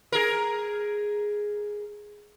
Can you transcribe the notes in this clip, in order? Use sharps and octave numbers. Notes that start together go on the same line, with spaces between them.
G#4 A#4